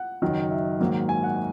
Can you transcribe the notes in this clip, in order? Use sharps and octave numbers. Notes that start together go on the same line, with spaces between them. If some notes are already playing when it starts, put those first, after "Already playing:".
Already playing: F#5
F#1 F#2 D#3 F#3
E5
G#2 D#3 F#3 A#3
G#5
F#5